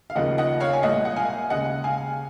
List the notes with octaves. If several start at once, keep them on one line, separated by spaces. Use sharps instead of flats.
F5
D#2 C#3 F3 A#3 D#4 D#5 F#5
D#5 F#5
C#5 F5
G#5
C2 A#2 G#3 D#5 F#5
F#5
F5 G#5
D#2 C#3 G#3 D#5 F#5
F5 G#5